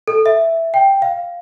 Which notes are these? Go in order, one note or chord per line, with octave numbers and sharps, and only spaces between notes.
A4
E5
G5
F5